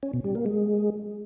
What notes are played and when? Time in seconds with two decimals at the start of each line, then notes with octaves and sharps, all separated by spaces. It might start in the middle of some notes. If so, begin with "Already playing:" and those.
0.03 C#4
0.14 B2
0.24 G3
0.35 A#3
0.46 G#3